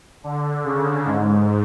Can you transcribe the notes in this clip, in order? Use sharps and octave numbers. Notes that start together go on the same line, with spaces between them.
D3
C#3
G#2